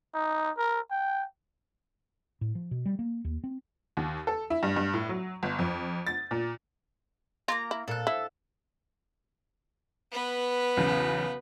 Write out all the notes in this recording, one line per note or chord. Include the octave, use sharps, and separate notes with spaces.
D#4
A#4
G5
A2
F3
B2
G3
A#3
D#2
C4
D#2
A4
E4
G2
G2
A2
F#3
G1
F2
A6
A#2
A#3 C4 F4 A#5
E4
A#2 A4 F#6
E4 E5
B3 B4
B1 E2 C#3